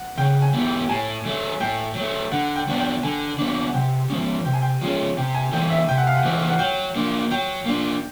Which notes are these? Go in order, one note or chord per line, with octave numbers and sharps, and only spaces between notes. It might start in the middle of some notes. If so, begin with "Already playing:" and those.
Already playing: F#5
C#3 G5
G#5
F#3 B3 E4 G4
G5
A2 G#5
F#3 A3
A2 G5
F#3 A3
D3 F#5
G5
F#3 B3 D4
G5
D3 G#5
F#3 B3 D4
F#5
C3 G5
F3 G#3 C#4
C3 G5
G#5
G5
F3 G#3 C#4
C3 G5
G#5
E3 A3 C4 D#4 G5
E5
C3 G5
F#5
F5
F#5
E3 A3 C4 D#4
F#5
F#3 G5
A#3 D4
F#3 G5
A#3 D4